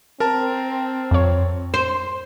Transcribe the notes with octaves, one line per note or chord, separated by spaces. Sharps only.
C4 A#4 A5 A#5
F2 C#5
C5